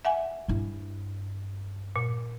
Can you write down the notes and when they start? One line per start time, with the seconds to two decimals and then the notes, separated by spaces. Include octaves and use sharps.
0.05 E5 F#5 G#5
0.48 G2 E4
1.96 A#2